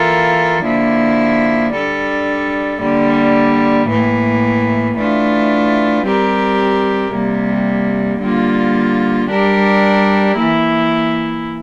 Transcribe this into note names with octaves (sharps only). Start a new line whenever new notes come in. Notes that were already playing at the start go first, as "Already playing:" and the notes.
Already playing: E3 A#3 F4 A4
D3 F3 A#3 E4
G3 D4 A4
D3 G3 A#3
A2 E3 A#3
E3 A3 D4 F4
G3 C4 G4 A#4
C3 G3 A#3
D3 G3 A#3 F4
G3 D4 G4 A#4
E3 A#3 E4